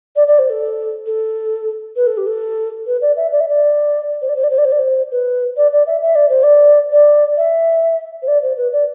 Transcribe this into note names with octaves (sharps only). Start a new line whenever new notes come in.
D5
D5
C5
A4
A4
B4
A4
G4
A4
B4
D5
E5
D5
E5
D5
C5
D5
C5
D5
C5
D5
C5
D5
C5
B4
D5
D5
E5
E5
D5
C5
D5
D5
E5
C5
D5
C5
B4
D5